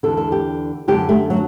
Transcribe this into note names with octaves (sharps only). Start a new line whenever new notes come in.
E2 D3 A4
A4
G4
F#2 D3 G4
A3
F#3